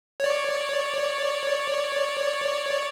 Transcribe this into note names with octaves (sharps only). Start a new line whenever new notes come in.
C#5 D5